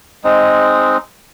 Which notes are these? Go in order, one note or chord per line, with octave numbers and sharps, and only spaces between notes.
G#3 C4 D#4